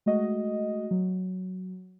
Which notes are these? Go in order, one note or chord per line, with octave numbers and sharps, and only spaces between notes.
G#3 A3 F#4 D#5
F#3